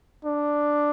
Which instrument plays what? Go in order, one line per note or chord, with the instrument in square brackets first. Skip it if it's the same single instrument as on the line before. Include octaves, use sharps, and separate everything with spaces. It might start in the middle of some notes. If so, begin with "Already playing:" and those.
[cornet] D4